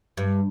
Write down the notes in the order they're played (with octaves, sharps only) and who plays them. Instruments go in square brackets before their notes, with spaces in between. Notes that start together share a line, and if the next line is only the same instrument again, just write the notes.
[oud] G2